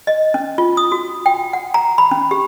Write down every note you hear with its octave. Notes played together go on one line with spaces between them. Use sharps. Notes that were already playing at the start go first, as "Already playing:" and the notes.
D#5
C#4
F4
D#6
F#4
G5
F#5
A#5
B5
C#4
G4